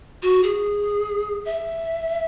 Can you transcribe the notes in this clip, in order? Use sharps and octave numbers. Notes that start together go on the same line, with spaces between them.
F#4
G#4
E5